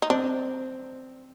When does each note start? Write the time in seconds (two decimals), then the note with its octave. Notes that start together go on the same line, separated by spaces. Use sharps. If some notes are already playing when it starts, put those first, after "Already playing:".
0.02 D#4
0.10 C4 D4